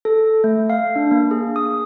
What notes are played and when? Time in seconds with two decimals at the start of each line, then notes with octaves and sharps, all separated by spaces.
0.05 A4
0.44 A3
0.70 F5
0.96 D4
1.11 A#3
1.31 G#4
1.56 D#6